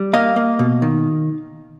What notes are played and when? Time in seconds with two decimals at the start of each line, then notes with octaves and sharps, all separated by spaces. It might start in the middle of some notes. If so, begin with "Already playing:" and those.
Already playing: G3
0.13 A#3 D#5 F5
0.36 A#3
0.59 B2
0.82 D#3